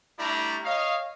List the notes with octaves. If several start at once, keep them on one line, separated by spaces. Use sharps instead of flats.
G3 A3 D4 E4 A#5
C#5 D#5 F5